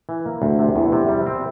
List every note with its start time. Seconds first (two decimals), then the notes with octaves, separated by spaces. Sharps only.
0.09 E3
0.26 A#3
0.42 D2
0.59 C3
0.76 E2
0.92 C3
1.09 G3
1.27 C4